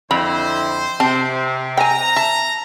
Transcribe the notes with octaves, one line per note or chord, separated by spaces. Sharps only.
F2 D3 C4 E4 C5 B5
C3 C4 A5
G5 G#5 A#5
E5 A5